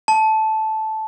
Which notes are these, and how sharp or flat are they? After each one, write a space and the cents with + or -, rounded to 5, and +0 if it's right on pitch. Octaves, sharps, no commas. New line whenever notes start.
A5 -10